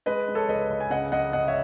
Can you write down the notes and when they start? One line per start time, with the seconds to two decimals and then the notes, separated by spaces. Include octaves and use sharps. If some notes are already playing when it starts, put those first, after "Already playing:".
0.06 G#3 B4 D#5
0.28 G#3
0.35 A4 C#5
0.49 C#2 B4 D#5
0.70 C#2
0.80 G#5
0.90 C#3 D#5 F#5
1.12 C#2 D#5 F#5
1.33 C#3 D#5 F#5
1.48 C#5 E5